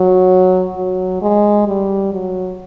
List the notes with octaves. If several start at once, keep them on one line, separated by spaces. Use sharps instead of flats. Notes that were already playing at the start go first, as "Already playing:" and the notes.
Already playing: F#3
F#3
G#3
G3
F#3